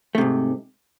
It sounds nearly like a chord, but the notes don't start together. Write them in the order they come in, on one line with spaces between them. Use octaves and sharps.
A3 C3 G#2